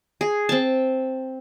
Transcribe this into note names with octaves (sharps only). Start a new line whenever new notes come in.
G#4
C4 A5